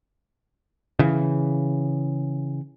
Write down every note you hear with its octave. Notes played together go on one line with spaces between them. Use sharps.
C#3 E3